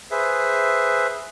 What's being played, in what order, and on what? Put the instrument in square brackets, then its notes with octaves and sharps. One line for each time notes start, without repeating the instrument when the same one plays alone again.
[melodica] G#4 B4 C5 E5